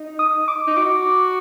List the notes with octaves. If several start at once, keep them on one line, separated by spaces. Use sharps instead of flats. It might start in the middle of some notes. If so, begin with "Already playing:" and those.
Already playing: D#4
D#6
D6
D#4
F#4 D6